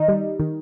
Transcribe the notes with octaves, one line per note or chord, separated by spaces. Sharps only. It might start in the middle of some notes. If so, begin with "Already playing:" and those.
Already playing: D#3 D#4
G3
D#3